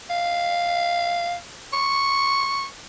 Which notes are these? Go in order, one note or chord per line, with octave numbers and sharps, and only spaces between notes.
F5
C#6